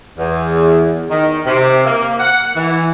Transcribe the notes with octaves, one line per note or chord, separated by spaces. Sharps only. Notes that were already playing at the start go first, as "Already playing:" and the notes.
E2
D#3
C3
A#3
F#5
E3